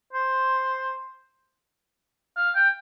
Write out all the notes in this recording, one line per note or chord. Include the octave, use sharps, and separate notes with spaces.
C5
F5
G5